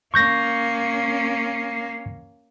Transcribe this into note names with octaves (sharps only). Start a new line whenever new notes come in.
A#3 C#4 C#6 G6 A#6